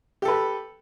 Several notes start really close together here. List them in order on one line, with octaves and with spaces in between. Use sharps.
G4 A4 B4